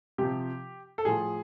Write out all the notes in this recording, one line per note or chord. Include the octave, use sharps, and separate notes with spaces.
C3 F3 G4
A4
A2 F3 G#4